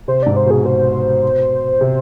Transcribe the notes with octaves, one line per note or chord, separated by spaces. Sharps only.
C3 C5
G#2 D5
C5
B2 G#4
C5
C3